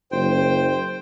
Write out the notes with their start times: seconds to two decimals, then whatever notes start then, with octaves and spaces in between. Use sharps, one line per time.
0.12 F#1 C5 G5